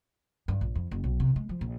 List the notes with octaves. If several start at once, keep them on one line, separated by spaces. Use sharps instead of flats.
G2
A#1
F2
F#1
B1
C3
G#3
F3
A#1